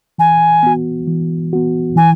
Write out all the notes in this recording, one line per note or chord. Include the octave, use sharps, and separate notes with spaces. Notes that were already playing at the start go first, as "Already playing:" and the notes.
E3 G#5
B3 F#4
E3
B3 F#4
E3 G#5